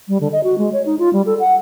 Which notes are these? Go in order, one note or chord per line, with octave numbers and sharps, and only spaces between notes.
G3
D3
D#5
F#4
G#3
C#5
D#4
F4
G3
A4
F#5